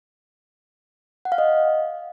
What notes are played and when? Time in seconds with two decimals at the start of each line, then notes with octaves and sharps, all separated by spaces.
1.25 F#5
1.32 F5
1.38 D#5